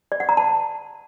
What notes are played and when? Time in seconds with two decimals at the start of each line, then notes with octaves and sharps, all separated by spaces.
0.12 D5
0.20 F#5
0.29 A#5
0.37 A5